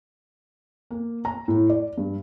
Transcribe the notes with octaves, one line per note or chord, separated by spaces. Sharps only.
A#3
A#5
A2
D5
G2